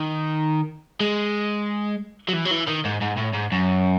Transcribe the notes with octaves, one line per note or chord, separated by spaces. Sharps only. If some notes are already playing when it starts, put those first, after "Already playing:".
Already playing: D#3
G#3
F#3
E3
F#3
E3
D#3
G#2
G#2
A2
G#2
F#2